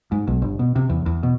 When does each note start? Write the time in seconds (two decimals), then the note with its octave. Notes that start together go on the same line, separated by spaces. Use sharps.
0.12 G#2
0.27 B1
0.42 G1
0.59 B2
0.76 C3
0.90 E2
1.06 E2
1.23 B2